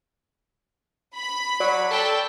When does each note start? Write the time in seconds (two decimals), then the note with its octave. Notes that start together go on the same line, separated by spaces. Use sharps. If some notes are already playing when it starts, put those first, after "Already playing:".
1.17 B5
1.60 F#3 D5
1.91 A4 G5 A5